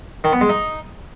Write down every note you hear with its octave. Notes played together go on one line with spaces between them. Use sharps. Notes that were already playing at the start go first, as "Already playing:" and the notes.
D#3
B3
G#3
D#4